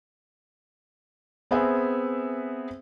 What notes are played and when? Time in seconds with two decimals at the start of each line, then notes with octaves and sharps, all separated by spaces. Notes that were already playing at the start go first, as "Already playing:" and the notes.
1.51 B3 C4 G#4 B4 E5 G#5